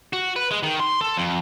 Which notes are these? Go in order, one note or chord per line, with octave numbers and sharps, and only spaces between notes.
F#4
B4
G#3
D#3
C6
A4
F2